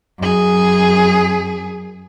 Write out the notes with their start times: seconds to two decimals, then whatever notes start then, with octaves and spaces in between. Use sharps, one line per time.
0.19 F#2 G#4